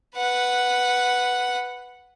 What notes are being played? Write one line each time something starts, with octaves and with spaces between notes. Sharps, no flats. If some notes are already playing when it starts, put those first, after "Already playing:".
B4 F#5